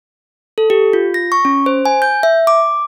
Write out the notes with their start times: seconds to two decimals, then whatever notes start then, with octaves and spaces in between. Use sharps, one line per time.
0.58 A4
0.70 G4
0.93 F4
1.14 A#6
1.32 C#6
1.45 C#4
1.66 C5
1.85 G#5
2.02 G6
2.23 E5
2.47 D6